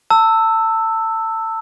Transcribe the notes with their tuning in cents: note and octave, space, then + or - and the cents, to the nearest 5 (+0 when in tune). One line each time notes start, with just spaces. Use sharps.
A5 +30 E6 +0